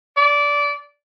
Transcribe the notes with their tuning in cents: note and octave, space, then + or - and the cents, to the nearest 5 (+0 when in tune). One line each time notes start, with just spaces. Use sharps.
D5 -20